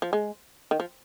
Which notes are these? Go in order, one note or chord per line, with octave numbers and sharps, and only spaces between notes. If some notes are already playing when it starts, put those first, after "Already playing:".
F3
G#3
D#3
F3